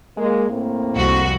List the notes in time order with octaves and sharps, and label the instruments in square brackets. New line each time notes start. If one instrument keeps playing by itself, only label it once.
[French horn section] G#3 A#3
A2 A#3 C4
[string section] C2 F2 F#4